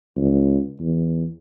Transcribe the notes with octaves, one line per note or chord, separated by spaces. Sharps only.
C#2
E2